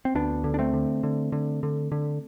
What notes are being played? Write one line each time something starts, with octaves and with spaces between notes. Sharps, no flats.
C4
D2 B3 D4
D3
D4
A3 C4
D3
D3
D3
D3
D3